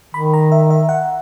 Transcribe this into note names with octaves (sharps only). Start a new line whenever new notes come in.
D#3 B5
A#5
E5
E5
F#5